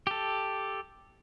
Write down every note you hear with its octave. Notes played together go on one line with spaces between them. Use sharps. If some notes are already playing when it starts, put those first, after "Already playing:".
G4 A4